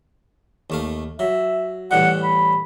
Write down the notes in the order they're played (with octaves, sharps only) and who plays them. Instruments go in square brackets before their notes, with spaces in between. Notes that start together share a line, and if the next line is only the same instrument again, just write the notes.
[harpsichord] D#2 A3 F5
[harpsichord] F#3 [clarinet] E5
[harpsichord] A2 E3 G3 [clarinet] F#5
[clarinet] B5